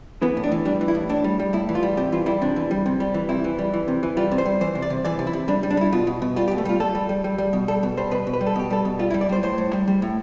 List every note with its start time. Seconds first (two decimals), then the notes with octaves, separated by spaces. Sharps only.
0.22 E3 B3
0.37 A2
0.44 D4
0.52 E3
0.65 G3 D4
0.81 E3
0.88 E4
0.95 A2
1.09 A2 D4
1.24 G3
1.40 G3
1.53 A2 E4
1.69 E3
1.75 F4
1.83 G3
1.97 C3 G4
2.12 E3 F4
2.26 G3 E4
2.41 C3 D4
2.56 E3
2.71 G3
2.86 C3
3.00 G3
3.14 E3
3.29 C3 E4
3.44 E3
3.59 G3
3.74 E3
3.88 C3
4.03 E3
4.17 G3 F4
4.31 C3
4.38 C5
4.46 G3
4.61 E3 C5
4.75 C3
4.82 D5
4.90 C3
5.05 E3 D5
5.19 C3
5.27 E4
5.33 C3
5.48 G3 D4
5.63 G3
5.70 D4
5.77 G3 E4
5.92 B2 F4
6.07 B2
6.22 B2
6.36 G3 F4
6.48 G4
6.51 B2
6.58 A3
6.65 G3 F4
6.80 G3 A4
6.95 G3
7.09 G3
7.24 G3
7.38 G3
7.53 B2
7.68 G3 A4
7.83 B2
7.97 G3 C5
8.11 B2 B4
8.27 B2
8.33 B4
8.41 G3
8.47 A4
8.55 B2 G4
8.70 G3 A4
8.85 B2
8.99 G3 F4
9.10 E4
9.14 G3
9.21 D5
9.29 G3 C5
9.43 A2 C5
9.58 A2
9.73 G3
9.88 G3
10.02 A2